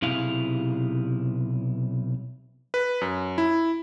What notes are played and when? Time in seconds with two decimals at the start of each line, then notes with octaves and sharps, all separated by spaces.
0.02 B1 C3 E4 G#4 F5
2.74 B4
3.01 F#2
3.38 E4